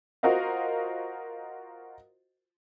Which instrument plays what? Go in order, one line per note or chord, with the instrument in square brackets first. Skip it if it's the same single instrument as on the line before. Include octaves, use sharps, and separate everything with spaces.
[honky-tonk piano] F4 F#4 A#4 C5 D#5 F5